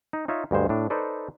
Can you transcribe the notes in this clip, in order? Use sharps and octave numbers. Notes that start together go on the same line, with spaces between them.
D#4
D#4 F4 C#5 E5
D2 G2 G#3 C5
A2 D4
D#4 A4 B4 C5 D5